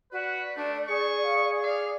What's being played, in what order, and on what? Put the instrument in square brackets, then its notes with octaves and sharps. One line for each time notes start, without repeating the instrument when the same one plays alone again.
[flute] F#4 [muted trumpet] B4 [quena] D5
[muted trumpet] A3 [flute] D4
[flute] G#4 [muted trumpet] C#6
[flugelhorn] F5
[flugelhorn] D5 [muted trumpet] F5